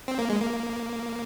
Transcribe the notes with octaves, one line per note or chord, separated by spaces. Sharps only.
C4
A#3
G#3
A#3